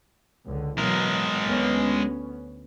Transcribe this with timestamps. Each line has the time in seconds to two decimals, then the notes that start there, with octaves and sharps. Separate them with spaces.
0.45 C#2 D3
0.78 B2 E3 F#3 G#3 A#4
1.44 D2 B3 C#4